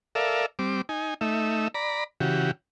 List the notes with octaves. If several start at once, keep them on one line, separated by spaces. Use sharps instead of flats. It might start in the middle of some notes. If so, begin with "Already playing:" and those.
A4 A#4 D5 E5 F5
G3 C4 D6
D#4 G#5
A3 D#4 E5
D5 A#5 B5
C#3 E3 F#4 G4